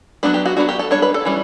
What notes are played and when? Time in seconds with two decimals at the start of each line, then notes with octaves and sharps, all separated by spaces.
0.23 F#3 B3 D4 B4
0.34 G4
0.46 F#4
0.57 F#3 B3 D4 F#4
0.69 G4
0.79 A4
0.91 G3 D4 C#5
1.02 B4
1.14 A4
1.25 E3 G3 C#4